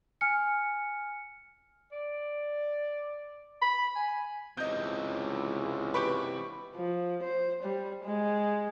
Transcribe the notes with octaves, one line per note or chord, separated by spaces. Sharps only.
G#5 F6 C#7
D5
B5
G#5
C#2 C3 E3 D#5 G6
G4 B4 B5 C#6 D7
F3
C5
G3
G#3